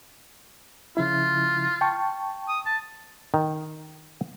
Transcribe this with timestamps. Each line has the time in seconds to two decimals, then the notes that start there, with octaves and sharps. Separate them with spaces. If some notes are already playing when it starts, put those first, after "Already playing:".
0.97 C#3 F3 E4 F4
1.81 G5 A5 C#6
2.48 D#6
2.66 A5
3.34 D#3